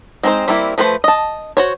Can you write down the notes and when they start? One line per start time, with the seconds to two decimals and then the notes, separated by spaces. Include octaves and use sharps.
0.23 G#3 C4 D#4 G#4 C5
0.48 G3 A#3 C4 E4
0.78 F3 A3 B4 C5
1.04 D#5 A5
1.57 F#4 C5 C#5